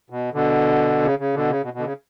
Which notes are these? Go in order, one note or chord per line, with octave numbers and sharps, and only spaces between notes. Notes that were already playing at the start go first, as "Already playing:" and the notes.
B2
B2 D3
C#3
C#3
B2 D3
C#3
B2
B2
D3
C#3